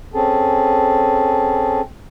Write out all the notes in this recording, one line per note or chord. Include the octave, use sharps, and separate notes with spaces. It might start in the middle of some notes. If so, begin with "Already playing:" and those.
C4 C#4 G#4 A4